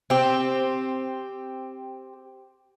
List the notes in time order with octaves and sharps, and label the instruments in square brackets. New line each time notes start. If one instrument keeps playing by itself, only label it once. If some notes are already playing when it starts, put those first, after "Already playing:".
[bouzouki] C4 G4